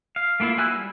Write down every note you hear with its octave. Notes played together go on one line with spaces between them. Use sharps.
F5
A3 A#3 E4 F4 E5
F#3 E4 G#5 E6 F#6
G3